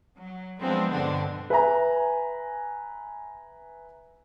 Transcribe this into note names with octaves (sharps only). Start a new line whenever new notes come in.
F#3
F3 F#3 G#3 B3 C4 D4
G2 B2 D3 C4 D4
B4 E5 G#5 A#5